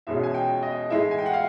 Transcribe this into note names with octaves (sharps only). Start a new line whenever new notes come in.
E2 B2 G#3 C#4 E5
G#5
G5
D#5
A2 E3 G#3 E5
G#5
G5
F#5
F5